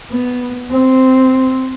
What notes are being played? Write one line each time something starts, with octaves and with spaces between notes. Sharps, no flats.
B3
C4